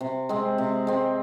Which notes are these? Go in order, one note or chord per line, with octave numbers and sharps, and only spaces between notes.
C3
G#3 C4
C3
G#3 C4